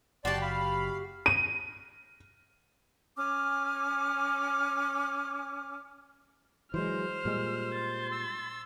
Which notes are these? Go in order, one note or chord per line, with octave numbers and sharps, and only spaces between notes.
F#1 F#4 G4 D5 A5 C6
F5 B5
D#7
C#4 G#5 D6 F6
E3 F#3 G#3 C5 F6
A#2 G3 G#3
C6 A6
E6